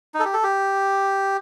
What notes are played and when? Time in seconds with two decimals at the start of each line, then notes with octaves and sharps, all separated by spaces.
0.14 D#4
0.19 A4
0.25 G4
0.34 A4
0.43 G4